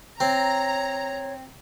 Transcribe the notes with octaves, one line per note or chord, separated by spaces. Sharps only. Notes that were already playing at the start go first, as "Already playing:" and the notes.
C4 C#5 A#5